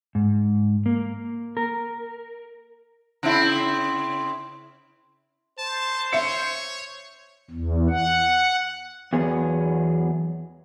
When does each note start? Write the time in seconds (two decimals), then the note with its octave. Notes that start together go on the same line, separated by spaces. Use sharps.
0.15 G#2
0.86 A#3
1.57 A#4
3.23 C#3 C4 E4
5.58 C5 A5
6.13 C#5 E5 C#7
7.51 E2
7.90 F#5
9.13 E2 F#3 B3 G#4